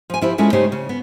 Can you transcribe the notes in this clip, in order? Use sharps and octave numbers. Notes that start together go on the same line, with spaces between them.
F3 G#5
F3 E4 G4 C5
G#3 C#4 E4 F4 A4
C#3 A3 C#4 D#4 G4 C5
C#3
B3